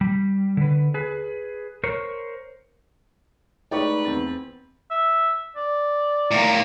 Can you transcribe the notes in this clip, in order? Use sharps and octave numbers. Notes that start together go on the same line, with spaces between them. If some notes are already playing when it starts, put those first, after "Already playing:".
G3
D3 B4
G#4 B4
A#4 C5 C#5
G#3 A3 D#4 B4 D5 G5 C#6
E2 C4 A6
E5
D5
A2 A#3